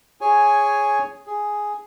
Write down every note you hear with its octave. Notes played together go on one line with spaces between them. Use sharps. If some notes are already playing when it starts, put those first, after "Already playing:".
G#4 C#5 G#5
G#4